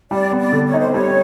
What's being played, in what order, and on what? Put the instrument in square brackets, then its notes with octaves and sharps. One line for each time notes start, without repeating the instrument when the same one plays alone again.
[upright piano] G3 [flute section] D5
[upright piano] B3
[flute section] D5
[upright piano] D3
[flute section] C#5
[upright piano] D#4
[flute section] C5
[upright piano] G3 [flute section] C#5